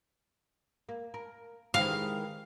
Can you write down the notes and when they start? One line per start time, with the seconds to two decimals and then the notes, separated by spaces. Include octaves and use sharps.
0.89 A#3
1.14 A#4
1.74 D#3 E3 G#3 F5